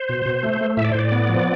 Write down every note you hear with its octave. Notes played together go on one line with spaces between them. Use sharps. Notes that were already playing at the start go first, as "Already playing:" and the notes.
Already playing: C5
B2
B2
A3
A3
A2 E5
D5
C5
A2 D5
B3
F3